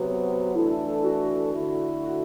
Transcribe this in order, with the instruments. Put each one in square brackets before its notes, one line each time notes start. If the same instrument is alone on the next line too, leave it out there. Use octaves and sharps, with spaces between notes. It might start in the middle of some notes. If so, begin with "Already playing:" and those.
Already playing: [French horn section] C3 F#3 B3 [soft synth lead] F#4
[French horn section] E3 A3 D4 A4 [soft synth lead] E4
[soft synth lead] F#4
[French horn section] D3 A3 E4
[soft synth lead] F#4